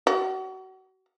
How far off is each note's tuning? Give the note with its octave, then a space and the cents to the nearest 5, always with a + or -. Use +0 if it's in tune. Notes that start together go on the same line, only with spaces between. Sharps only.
F#4 +35